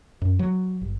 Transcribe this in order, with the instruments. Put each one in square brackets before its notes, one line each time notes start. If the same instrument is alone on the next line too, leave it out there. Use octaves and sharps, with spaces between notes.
[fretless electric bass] F#2
F#3
G1